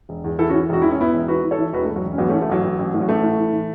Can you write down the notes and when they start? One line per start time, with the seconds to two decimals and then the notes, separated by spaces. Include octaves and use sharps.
0.09 E1
0.24 E2
0.39 E2 E4 A4
0.49 C#4 F#4
0.54 E3
0.69 E1 F#4
0.82 E3 E4
0.91 C#4
0.99 E1 B3 E4
1.13 E1
1.28 E3 F#4 B4
1.44 E3
1.51 A4 C#5
1.58 E3
1.73 E1 F#4 B4
1.84 A3
1.89 E1
1.96 F#3
2.03 E1
2.12 C#4
2.18 A1 F#3 B3
2.29 A3 C#4
2.33 E3
2.42 A3
2.49 A1 F#3
2.63 A1
2.79 A1
2.94 A2
3.00 F#3
3.09 A1 A3
3.23 A2
3.39 E3
3.53 E3